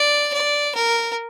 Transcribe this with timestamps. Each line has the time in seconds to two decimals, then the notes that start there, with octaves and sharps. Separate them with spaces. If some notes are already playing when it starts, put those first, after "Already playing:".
Already playing: D5
0.34 D5
0.75 A#4